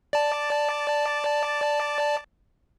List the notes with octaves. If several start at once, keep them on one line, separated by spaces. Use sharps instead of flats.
D5 A5